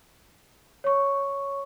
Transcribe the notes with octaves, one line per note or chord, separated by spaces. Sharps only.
C#5 C#6